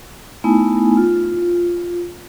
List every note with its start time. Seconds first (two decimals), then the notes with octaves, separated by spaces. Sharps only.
0.44 A3 B3 D#4 E4 G#5
0.97 F4